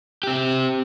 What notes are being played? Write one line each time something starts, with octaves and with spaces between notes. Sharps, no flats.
C4 G4